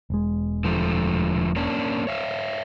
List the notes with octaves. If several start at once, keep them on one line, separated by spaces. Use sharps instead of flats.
E1 G#3
D3 F3 A3
A#3 C#4 D4
C#5 E5 F5